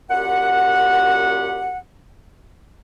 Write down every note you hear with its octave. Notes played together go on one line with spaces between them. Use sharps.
F#2 A#2 G4 F#5